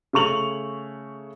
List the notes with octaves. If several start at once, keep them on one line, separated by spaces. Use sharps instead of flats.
C#3 A3 C#6 F7 F#7